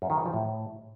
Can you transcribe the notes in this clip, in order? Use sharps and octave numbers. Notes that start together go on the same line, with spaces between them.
F#2
D#3
E3
F3
A2